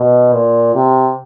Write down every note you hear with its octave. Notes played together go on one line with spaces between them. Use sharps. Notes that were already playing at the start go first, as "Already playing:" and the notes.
Already playing: B2
A#2
C3